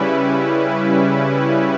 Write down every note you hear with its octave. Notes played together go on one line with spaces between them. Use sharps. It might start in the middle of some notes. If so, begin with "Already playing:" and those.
Already playing: C#3 G3 C#4 E4 B4